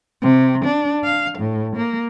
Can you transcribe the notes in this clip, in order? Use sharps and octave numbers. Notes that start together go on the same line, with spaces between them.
C3
D4
F5
A2
A#3